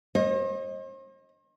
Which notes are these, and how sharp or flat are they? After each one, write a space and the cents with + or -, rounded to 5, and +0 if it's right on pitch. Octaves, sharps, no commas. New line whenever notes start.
C5 +45 D#5 +0